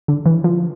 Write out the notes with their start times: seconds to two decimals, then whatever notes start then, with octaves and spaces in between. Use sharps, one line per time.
0.08 D3
0.26 E3
0.44 F3